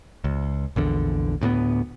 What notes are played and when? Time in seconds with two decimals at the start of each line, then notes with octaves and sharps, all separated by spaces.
0.24 C#2
0.76 A#1 E2 D3
1.41 D2 A2 A#3 B3